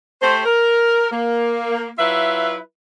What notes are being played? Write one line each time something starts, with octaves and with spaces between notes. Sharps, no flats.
A3 G4 C5
A#4
A#3
F#3 E4 F4 B4 E5